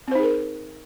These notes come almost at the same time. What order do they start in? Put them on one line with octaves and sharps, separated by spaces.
C4 C5 D#4 G#4 A#4